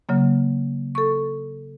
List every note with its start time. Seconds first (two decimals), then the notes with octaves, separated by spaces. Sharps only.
0.09 C#3 F#3 A#3
0.95 A4 C#6